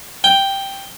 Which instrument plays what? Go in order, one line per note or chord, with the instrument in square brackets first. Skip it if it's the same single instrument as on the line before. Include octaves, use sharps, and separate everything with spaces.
[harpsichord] G5